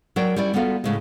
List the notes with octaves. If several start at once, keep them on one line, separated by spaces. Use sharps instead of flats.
F#3 A#4 D5 G5
G3 C#4 E4 D5
G3 B3 F4 F#4 A4 F5
A2 C#3 G#3